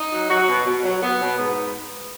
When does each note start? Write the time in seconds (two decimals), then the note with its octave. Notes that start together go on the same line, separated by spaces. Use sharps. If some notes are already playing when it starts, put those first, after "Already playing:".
Already playing: D#4
0.11 F#3
0.30 F#3 F#4
0.48 B2
0.65 B2
0.83 F#3
1.02 F#3 B3
1.20 B2
1.38 G#2 B3